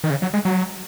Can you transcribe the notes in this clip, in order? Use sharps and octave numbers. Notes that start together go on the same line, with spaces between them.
D#3
C#3
F#3
G#3
F#3